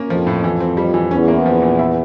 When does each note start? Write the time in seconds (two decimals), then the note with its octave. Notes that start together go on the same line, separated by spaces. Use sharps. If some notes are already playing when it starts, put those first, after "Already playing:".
Already playing: A#3 C#4
0.10 F2 F3
0.27 A2
0.44 E3
0.60 C4
0.77 G3
0.94 E3
1.11 E2 C#4
1.28 A#3
1.46 F3
1.62 A#2
1.79 E4